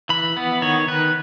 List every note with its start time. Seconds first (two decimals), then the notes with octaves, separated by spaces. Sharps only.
0.09 E3 B5
0.37 B3
0.62 D#3 C#5
0.88 D#3 B4